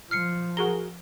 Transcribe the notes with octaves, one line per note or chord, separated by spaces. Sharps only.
F3 F6 C7 C#7
F#4 G#4 A#4 G7